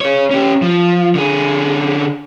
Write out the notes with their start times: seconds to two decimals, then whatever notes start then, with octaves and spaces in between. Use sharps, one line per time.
0.01 G#4 C#5
0.31 C#4 G4
0.62 F3
1.15 D3 G#4